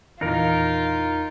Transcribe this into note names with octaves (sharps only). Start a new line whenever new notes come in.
E2 A#2 E3 D#4 F4 A#4